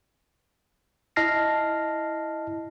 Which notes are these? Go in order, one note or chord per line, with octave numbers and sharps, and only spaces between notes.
E4 D#5 A5 F6 A#6 C7